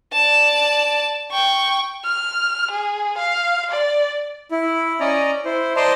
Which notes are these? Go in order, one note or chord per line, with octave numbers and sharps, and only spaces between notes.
D5 A5
G5 C#6
F6
G#4
F5
D5
E4
C#4 D5 D#5 A#5
E4 C5
C5 D5 D#5 A5 A#5 C6